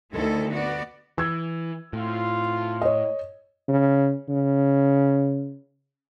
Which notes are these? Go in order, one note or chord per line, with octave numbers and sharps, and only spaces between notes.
D2 D#3 E4 A4
B3 F#4 D5
E3 E6 G#6
A2 C4 F4
C#5 D#5
C#3
C#3